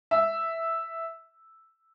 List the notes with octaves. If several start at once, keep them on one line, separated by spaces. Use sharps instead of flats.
E5